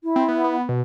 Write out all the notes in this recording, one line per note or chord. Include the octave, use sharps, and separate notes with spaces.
E4
C4
B3
B3
B2